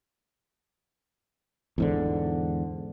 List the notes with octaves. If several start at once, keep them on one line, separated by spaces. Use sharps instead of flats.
E2 G#2 D3